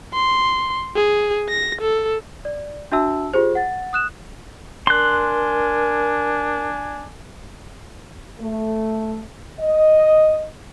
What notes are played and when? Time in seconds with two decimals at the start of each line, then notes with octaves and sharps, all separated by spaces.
0.14 C6
0.96 G#4
1.49 A#6
1.81 A4
2.45 D5
2.92 D4 F#4 E5 A5 E6
3.34 F4 G4 G#4 C5
3.55 F#5 A6
3.93 D#6 F#6 E7
4.87 D4 A#4 G#5 C6 F#6
8.40 A3
9.60 D#5